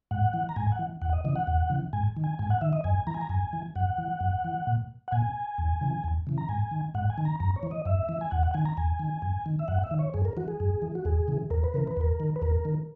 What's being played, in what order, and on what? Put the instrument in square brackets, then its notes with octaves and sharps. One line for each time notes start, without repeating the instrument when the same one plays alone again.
[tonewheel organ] G#2 F#5
E3
A#5
G#2 G#5
F#5
E3
E2 F#5
D#5
C#3 E3 D#5
F#5
E2
C#3 E3
G#2 G#5
D#3
G#5
G#2 G#5
F#5
D#3 E5
D#5
F#2 G#5
E3 A#5
G#5
A#5
F#2 G#5
E3
F#2 F#5
E3
F#2
E3
A#2
F#5
A#2 G#5
E2
C#3 E3
E2
C#3 E3
A#5
G#2 G#5
D#3
G#2 F#5
G#5
D#3
A#5
F#2 A#5
C#5
E3
D#5
F#2 E5
E3
G#5
E2 F#5
F#5
D#3 G#5
A#5
E2 G#5
D#3
F#2
D#3
E5
F#2 F#5
E5
D#3
C#5
F#2 G#4
A#4
E3 F#4
G#4
F#2
E3
F#4
E2 G#4
C#3 E3
E2 A#4
B4
C#3 E3 A#4
B4
E2 A#4
D#3
B4
E2 A#4
D#3